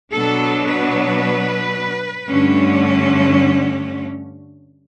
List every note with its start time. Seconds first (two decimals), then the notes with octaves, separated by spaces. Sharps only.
0.13 B2 F#3 B3 D4 A4
0.68 B4
2.29 G2 D3 A3 C#4